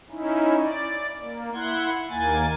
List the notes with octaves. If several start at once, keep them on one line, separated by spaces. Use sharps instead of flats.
C#4 D#4 E4
D5
A#3
E4 F#5 C6 G#6
D#2 A#3 G#5 A6